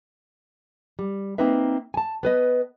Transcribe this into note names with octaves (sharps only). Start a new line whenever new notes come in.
G3
A#3 C4 D#4 B4 E5
G#5 A5
B3 B4 D#5